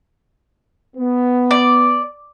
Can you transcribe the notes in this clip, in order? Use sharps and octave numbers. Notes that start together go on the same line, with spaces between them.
B3
D5